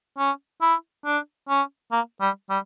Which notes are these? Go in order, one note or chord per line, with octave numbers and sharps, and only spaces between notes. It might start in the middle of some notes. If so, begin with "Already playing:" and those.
C#4
E4
D4
C#4
A#3
G3
G3